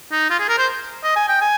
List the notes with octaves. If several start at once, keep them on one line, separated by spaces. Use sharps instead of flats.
D#4
F4
G#4
A#4
C5
D#5
G#5
G5
G#5